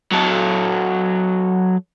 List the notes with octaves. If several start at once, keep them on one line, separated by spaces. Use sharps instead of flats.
F#3 A4